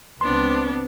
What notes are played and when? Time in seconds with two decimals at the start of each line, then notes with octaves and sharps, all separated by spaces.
0.21 C#2 B3 C4 D4 C6